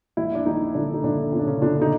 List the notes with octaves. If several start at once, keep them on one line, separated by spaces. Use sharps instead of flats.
A#1 E3 E4
D4
A#1 D#3 D#4
A#1 D3 D4
D#4
A#1 D3 D4
A#2 C#4
D4
C#3 C#4
A#2 D3 D4
D#4